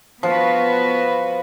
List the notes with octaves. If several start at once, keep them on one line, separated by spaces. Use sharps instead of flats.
F3 B3 F#4 B4